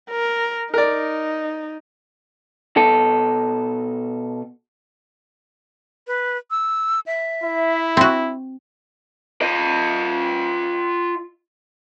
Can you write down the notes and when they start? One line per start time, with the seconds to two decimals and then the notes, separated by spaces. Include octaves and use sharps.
0.10 A#4
0.74 D#4 A#4 D5
2.77 B2 A4
6.07 B4
6.51 E6
7.06 E5
7.44 E4
7.97 C4 F#4
9.42 F4 D#5